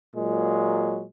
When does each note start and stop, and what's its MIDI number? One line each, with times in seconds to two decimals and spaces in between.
0.16 1.04 46
0.16 1.04 54
0.16 1.04 56